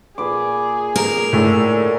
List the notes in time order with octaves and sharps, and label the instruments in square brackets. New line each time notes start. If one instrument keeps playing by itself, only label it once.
[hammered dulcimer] A#2 B4 D6 [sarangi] G#4
[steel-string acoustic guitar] A#4
[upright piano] A2 [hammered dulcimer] D3 E5